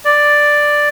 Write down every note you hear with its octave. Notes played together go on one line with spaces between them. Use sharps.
D5